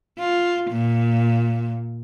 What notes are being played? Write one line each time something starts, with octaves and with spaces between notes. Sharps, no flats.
F4
A#2